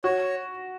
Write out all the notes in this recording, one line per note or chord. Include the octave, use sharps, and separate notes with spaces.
F#4 C#5